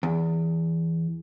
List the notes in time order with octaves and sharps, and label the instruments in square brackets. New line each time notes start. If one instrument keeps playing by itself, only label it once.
[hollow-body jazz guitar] E2